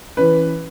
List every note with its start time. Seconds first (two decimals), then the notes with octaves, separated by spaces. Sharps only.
0.17 E3 C#4 B4